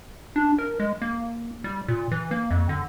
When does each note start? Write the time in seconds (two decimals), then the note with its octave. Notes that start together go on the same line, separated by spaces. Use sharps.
0.36 D4
0.58 A#4
0.80 G#3
1.02 A#3
1.64 G3
1.88 A#2
2.12 E3
2.31 A#3
2.51 F2
2.69 D3